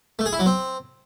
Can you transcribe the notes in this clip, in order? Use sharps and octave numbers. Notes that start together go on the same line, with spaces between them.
A3
G#4
E4
F#3
C4